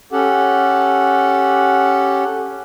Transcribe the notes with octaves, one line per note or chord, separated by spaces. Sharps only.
C#4 G4 A4 F#5